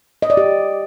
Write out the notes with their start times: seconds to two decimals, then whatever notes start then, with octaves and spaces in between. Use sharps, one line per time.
0.22 D#5
0.30 D5
0.37 G4